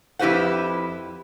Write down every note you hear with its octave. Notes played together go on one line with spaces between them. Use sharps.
F2 E4 G4 B4 C5 F#5